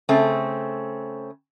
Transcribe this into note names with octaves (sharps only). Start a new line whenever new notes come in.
C#3 A3 C4